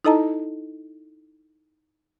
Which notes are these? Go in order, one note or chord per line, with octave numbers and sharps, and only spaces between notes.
D#4 E4 A4 D#5 A5 A#5